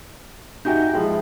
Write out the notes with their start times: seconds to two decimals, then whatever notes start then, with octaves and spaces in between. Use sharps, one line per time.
0.65 D#4 F#4 G4 E5 G#5 G6
0.93 F3 G#3 E4 G5